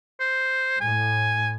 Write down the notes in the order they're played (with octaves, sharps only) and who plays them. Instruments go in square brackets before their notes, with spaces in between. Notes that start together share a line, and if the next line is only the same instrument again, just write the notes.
[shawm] C5
[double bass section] A2 [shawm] G#5